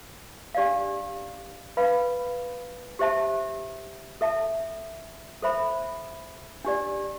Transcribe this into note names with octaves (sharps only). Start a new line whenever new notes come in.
D4 G4 D5 F5
B4 F5 B5
G4 C5 E5 A5
A4 E5 A5
A4 C5 E5 B5
D4 G4 D5